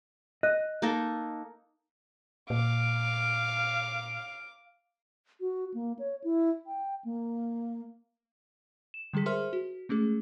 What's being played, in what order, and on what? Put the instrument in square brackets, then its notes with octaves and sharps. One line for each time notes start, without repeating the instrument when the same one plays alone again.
[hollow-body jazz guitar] D#5 [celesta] F#6
[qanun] A#3 D#4 A4
[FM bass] A#2 [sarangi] F5 [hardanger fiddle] D6
[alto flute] F#4
A#3
C#5
E4
G5
A#3
[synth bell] E7
D3 G3 G#3 G#4 B6
G#4 A#4 C5 E5 C6 F6
F#4
G#3 A3 C#4 G#4